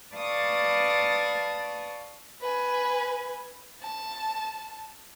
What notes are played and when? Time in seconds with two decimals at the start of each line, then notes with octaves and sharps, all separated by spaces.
0.15 B4 D5 F5 A5 C#6 D#6
2.41 B4 G#5
3.82 A5